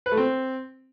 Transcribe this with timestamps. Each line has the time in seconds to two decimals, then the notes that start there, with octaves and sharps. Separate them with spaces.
0.06 B4
0.12 A3
0.17 C4